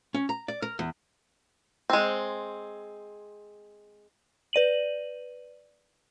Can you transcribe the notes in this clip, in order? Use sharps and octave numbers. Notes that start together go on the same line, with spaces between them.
C#4
A#5
D5
A#4
E2
G#3 C4
B4 D5 D#7 F#7